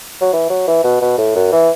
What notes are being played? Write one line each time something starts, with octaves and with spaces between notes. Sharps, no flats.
F#3
E3
F#3
E3
B2
B2
A2
F#2
E3